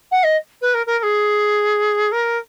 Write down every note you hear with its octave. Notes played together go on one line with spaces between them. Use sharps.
F#5
D#5
B4
A#4
A#4
A#4
G#4
A#4